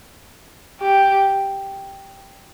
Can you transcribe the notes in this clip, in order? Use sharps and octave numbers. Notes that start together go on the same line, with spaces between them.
G4